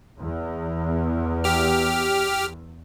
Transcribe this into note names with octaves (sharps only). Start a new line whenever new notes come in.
E2
G4 F6